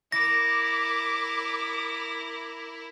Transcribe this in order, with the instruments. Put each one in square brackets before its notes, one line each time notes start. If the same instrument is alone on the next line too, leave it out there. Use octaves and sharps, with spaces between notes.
[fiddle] E4 A#4 [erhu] D6 [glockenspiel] A#6